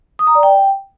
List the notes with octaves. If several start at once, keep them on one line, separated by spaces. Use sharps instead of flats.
D#6
A#5
D5
G5